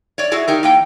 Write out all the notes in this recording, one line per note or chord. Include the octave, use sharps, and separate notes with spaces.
C#5 D5
E4 F#4 G#4
D#4 G4 A#4
E2 A#3 G5